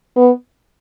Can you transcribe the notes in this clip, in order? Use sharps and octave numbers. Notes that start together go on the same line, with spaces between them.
B3